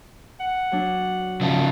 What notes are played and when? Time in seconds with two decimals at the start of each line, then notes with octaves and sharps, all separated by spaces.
0.40 F#5
0.72 F#3 D4
1.41 C#3 F3 D#5 A5